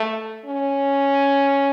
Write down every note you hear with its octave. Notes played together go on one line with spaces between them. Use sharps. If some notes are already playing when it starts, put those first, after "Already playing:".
Already playing: A3
C#4